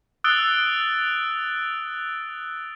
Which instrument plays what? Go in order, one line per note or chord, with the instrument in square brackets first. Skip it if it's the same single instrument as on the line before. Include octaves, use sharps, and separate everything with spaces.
[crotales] D#6 E6 F#6 A6 D7 G7